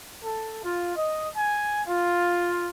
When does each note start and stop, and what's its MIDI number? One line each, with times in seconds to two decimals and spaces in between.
0.23 0.59 69
0.63 0.92 65
0.96 1.27 75
1.36 1.80 80
1.87 2.67 65